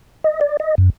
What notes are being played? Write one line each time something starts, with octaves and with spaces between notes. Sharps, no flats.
D#5
D5
D#5
F#2